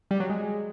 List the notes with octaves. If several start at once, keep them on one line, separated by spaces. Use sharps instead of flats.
G3
F#3
G#3